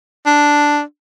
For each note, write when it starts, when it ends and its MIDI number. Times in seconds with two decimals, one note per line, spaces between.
0.26 0.81 62